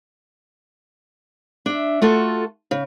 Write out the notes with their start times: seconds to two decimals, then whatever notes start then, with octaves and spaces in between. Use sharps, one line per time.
1.66 D4 E5
2.02 A3 F4 F#4 A4
2.71 C#3